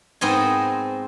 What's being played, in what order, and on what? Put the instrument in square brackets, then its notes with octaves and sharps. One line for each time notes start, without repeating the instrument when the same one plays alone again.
[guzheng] G#2 B3 C4 D#5 G#5